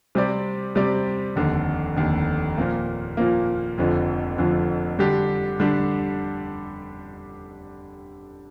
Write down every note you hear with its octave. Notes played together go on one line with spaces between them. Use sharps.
C3 G3 C4 G4 D5
C3 G3 C4 G4 D5
F1 D#2 D3
F1 D#2 D3
A#2 F3 A#3
A#2 F3 A#3
F1 F2 D3 F3
F1 F2 D3 F3
D3 G3 D4 G4
D3 G3 D4 G4